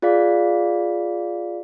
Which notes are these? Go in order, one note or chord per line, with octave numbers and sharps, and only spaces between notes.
F4 G#4 D5 F5 B6